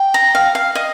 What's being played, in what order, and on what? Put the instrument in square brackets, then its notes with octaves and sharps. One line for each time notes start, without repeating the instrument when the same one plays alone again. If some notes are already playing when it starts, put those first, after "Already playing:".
Already playing: [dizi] G5
[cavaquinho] A#5
F5
F5
D#5